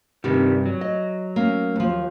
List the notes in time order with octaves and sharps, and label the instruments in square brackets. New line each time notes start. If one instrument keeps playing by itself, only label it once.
[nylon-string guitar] G2 C3 [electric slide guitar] D#3 G3
[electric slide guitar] F#3
[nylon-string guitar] D#5
A#3 C#4
D#2 F3